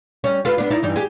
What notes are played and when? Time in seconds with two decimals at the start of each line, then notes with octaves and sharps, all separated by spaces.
0.24 G3 C#4
0.45 F4 A4 B4
0.58 B3 D4
0.70 D#4 E4 D5
0.83 G2 E3 D#4
0.96 G4 G#4